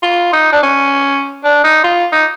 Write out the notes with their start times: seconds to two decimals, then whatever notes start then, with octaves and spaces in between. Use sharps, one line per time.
0.03 F4
0.33 D#4
0.52 D4
0.63 C#4
1.44 D4
1.64 D#4
1.84 F4
2.13 D#4